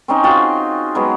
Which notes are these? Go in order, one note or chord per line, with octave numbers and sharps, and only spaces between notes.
C4 C#4 D#4 G#5
F4 F#4 G#4 G5
F#3 G#3 B3